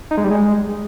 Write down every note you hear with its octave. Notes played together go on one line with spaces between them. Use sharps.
D#4
G#3
G3
G#3